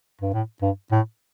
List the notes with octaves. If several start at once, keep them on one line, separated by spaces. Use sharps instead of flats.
G2
A2
G2
A2